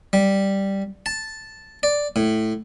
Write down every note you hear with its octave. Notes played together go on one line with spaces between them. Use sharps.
G3
A5
D5
A2